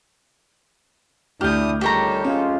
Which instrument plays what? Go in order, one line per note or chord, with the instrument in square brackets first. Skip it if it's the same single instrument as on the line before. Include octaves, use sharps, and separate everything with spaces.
[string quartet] D2 D#6 [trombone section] D4 E4 [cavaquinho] G4 [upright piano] F6 G6
[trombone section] C#2 D#3 G3 [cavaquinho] G4 C#5 A#5 [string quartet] A4
[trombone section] F2 G#3 F4 [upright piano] C#4